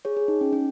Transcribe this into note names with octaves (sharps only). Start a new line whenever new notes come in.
G#4 C#5
G#4
D#4
C#4
C#4